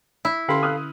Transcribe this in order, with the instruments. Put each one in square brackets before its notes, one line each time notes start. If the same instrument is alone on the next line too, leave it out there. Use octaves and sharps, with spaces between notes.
[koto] E4
[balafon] D3 C#4 C6 [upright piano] G4 [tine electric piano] A4 F5 B5
[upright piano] D#6 F6 F#6